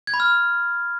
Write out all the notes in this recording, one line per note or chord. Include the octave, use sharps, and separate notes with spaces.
G#6
B5
F6